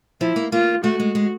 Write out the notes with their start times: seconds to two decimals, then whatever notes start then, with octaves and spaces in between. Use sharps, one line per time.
0.21 F3 E4
0.36 A#3
0.52 A#3 F4
0.84 A3 F#4
1.00 G#3
1.15 G#3